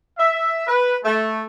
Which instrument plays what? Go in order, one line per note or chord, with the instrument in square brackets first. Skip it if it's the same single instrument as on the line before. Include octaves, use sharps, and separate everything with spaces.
[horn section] E5
B4
A3